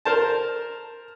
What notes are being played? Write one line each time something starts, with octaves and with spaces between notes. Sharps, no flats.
A#4 C5 A5